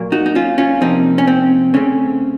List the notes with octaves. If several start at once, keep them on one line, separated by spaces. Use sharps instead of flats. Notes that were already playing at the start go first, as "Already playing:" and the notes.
Already playing: A#2 F#3 A#3
D#4 F#4
D#4
C#4 F4
C#4 F4
C3 F3 A#3 C4 D#4
C#4
C4
C#3 A3 C4 C#4